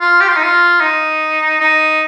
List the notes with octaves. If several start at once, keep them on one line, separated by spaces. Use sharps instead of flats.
F4
G4
F4
D#4
F4
D#4
D#4